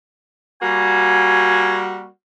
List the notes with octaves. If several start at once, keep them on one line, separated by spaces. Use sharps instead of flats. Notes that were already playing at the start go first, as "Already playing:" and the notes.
G3 A#3 F#4 G#5